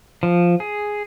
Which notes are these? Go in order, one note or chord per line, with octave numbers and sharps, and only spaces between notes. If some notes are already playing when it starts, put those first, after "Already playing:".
F3
G#4